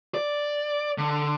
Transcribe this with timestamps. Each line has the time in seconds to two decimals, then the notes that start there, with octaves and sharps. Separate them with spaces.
0.14 D5
0.98 D3